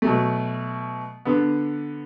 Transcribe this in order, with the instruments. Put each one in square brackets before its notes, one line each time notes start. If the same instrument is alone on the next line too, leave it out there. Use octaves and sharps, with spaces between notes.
[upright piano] B2 F#3 A3
D3 B3